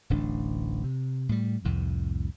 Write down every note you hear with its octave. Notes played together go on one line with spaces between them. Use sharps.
D1 A1 D4
C3
A2 G3
C2 F2 A2